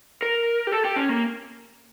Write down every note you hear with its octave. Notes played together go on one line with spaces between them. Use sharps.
A#4
G4
A4
G4
C#4
A#3